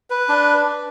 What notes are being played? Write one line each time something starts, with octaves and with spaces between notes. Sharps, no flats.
B4
D4